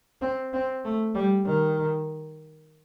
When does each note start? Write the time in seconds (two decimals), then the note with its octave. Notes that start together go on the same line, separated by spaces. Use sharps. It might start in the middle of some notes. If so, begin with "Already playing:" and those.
0.21 C4
0.53 C4
0.85 A3
1.15 G3
1.46 D#3